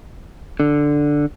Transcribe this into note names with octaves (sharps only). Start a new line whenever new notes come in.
D3